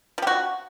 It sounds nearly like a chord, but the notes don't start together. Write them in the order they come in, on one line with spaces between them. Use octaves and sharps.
F3 G4 F#4